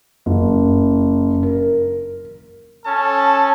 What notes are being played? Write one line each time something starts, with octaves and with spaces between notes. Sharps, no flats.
F#1
A#4
C#4 A4 A5